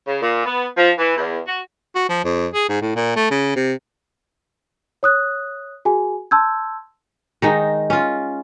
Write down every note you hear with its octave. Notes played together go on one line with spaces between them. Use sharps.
C#3
A#2
B3
F3
E3
E2
F#4
F#4
F3
F2
G#4
G#2
A2
A#2
A3
C#3
C3
C#5 D#6 F#6
F#4 G#4 G#5
A5 C6 E6 G6 G#6
D#3 G#3 D#4
C#4 F4